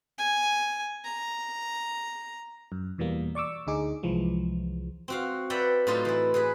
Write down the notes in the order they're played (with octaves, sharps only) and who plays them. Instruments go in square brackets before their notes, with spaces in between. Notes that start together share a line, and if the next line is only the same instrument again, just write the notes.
[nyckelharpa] G#5
A#5
[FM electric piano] F#2
E2 B2 E3 G3 A#3
D5 C#6 D6 E6
D2 D3 D#4 G#4 D6
C2 E3 F3 G#3
[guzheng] C4 F#4 F5
B4 D5 E5 F#5 G5 A#5
A2 F#3 D#4 F4 A4 C5
E3 E4
E3 G#4 B4